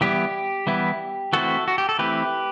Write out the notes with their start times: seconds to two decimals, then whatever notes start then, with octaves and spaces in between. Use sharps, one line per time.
0.01 E3 G3 B3 E4 G4
0.67 E3 G3 B3 E4
1.33 E3 A3 C4 E4 F#4 A4
1.68 F#4
1.78 G4
1.89 A4
1.99 E3 A3 C4 E4 G4 B4